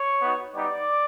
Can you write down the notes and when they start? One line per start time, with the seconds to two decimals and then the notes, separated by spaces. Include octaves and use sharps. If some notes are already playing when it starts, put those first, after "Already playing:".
Already playing: C#5 C#6
0.21 B3 D#4 F#4
0.54 G3 B3 D#4 G4 D5 D6